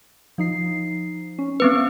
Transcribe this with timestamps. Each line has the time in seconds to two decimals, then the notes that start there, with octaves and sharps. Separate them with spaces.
0.38 F3 D#4 C7
1.39 C#4
1.60 B3 C4 B4